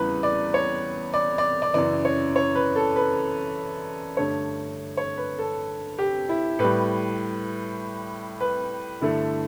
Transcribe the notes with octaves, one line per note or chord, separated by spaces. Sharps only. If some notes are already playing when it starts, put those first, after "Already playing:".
Already playing: E2 C#3 E3 G3 B4
D5
C#5
D5
D5
D5
F#2 C#3 E3 D5
C#5
C#5
B4
A4
B4
G2 D3 A3 C#5
C#5
B4
A4
G4
E4
A2 G3 B4
B4
G2 D3 A3 E4